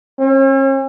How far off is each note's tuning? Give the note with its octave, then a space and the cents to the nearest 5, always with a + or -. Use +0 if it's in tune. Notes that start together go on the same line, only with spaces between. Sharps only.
C#4 -45